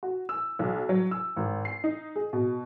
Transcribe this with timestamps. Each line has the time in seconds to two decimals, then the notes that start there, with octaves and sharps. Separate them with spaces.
0.03 F#4
0.29 E6
0.59 B1
0.89 F#3
1.11 E6
1.36 G#1
1.65 C7
1.84 D#4
2.16 G#4
2.33 B2